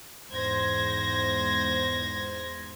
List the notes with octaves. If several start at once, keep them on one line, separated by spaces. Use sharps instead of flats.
E2 G#2 C5 G#6 A#6